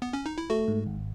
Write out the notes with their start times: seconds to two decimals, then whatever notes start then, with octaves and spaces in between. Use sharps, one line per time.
0.02 B3
0.13 C#4
0.26 D#4
0.38 E4
0.50 A3 F#4
0.68 G#2
0.87 G#1